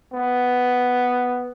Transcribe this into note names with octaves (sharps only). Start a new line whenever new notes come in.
B3